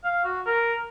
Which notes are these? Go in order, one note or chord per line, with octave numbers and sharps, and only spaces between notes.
F5
F#4
A#4